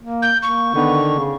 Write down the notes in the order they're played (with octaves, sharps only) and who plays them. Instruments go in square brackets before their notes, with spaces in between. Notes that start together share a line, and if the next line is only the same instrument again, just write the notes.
[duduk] A#3
[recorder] G6
[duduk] A#3 [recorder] C#6
[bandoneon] D3 D#3 [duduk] B3
[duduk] C#3